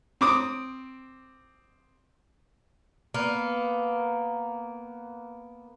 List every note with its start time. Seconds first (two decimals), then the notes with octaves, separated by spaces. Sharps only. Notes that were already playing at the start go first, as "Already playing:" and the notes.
0.21 C4 D6 D#6
3.14 A#3 B3